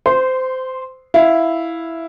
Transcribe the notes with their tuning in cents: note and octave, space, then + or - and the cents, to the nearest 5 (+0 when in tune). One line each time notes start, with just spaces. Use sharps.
C5 -20 C6 +0
E4 +0 F5 +0